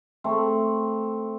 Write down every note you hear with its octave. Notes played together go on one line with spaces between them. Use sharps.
A3 C4